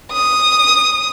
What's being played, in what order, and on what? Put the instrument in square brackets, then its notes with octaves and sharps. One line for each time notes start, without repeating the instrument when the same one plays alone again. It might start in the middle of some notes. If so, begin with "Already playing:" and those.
[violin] D#6